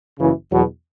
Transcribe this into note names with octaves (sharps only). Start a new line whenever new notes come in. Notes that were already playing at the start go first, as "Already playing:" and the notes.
F#1 F#2 C#3 E3
E2 B2 F#3